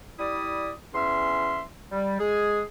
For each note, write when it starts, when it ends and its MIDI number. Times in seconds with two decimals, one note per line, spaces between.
0.19 0.72 55
0.19 0.72 64
0.19 0.72 74
0.19 0.72 87
0.94 1.61 40
0.94 1.61 61
0.94 1.61 76
0.94 1.61 84
1.91 2.19 55
2.20 2.63 56
2.20 2.63 68